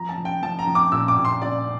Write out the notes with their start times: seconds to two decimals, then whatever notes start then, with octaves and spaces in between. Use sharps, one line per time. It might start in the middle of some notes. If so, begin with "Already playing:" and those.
Already playing: F3 A#5
0.09 A5
0.18 F3
0.25 G5
0.43 F3 A5
0.59 A#5
0.67 F3
0.75 D6
0.92 A#2 E6
1.08 D6
1.17 A#2
1.25 C6
1.42 A#2 D5